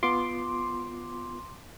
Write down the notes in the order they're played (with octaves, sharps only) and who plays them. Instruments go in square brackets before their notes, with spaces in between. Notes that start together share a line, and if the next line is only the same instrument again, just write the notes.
[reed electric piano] B3 F4 [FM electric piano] C6 D6